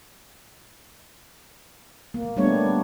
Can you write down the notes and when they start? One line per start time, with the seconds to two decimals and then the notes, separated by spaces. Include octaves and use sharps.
2.14 A#3
2.36 G3 A3 B3 D4 C#5